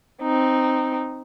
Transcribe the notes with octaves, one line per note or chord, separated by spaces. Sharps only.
C4 D#4